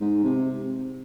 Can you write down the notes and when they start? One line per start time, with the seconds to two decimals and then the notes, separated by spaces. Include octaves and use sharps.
0.01 G#2
0.24 C3